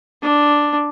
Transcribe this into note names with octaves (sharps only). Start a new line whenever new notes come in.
D4